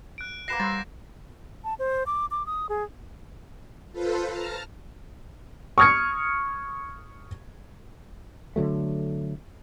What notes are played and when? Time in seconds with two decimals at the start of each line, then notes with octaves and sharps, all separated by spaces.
0.18 F#6 D7
0.48 A#3 B4 F#5 A#6 C7 E7
0.60 G3 C5 E6 A6
1.64 A5
1.79 C5
2.07 D6
2.31 D6
2.46 D#6
2.69 G#4
3.92 F4 A4 B4 C5
4.30 A5 A#5 F6
5.78 C#6 D#6 F6 G#6 C#7
8.56 D3 F3 F#3 A3